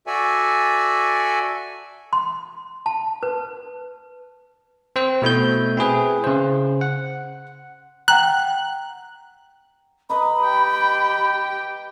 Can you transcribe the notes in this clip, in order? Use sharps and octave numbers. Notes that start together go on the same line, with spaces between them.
F#4 A4 D5 E5 G#5
C6
A5
B4
C4 C5
B2 A3 E4 G6
C4 E4 G#4 B4
C#3 C5
F#5
F#5 G5 A#5 F#6
B4 D#5 A#5 B5
G4 G5